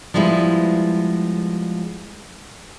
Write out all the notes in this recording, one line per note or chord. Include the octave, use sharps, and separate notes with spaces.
F3 G3 G#3 B3 E4